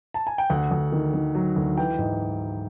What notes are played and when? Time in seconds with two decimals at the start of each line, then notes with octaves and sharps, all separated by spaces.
0.14 A5
0.27 G#5
0.38 G5
0.50 D2 F#5
0.71 D2
0.92 D#3
1.14 D#3
1.35 F#3
1.56 D2
1.77 E3 G5
1.99 G#2